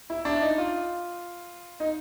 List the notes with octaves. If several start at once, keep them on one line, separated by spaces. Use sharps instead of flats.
E4
D4
D#4
F4
D#4